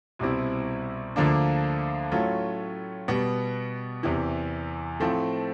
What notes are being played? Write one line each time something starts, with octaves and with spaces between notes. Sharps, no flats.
C2 B2 G3 C4 E4
D2 D3 F3 A#3 D4
A2 F#3 A3 C#4 F4
B2 G3 B3
E2 C3 E3
A2 F3 A3 C4